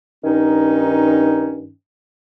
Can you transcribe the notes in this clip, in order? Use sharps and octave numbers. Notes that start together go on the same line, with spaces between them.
G2 D#3 C#4 D#4